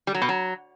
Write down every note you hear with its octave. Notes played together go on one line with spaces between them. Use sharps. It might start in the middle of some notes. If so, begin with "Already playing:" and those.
G3
F#3
B2
F#3